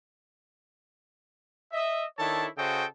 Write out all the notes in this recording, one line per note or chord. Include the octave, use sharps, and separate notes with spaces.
D#5 E5
D#3 D4 E4 A4 C#5 A5
C#3 F#4 A4 C5 D#5 G5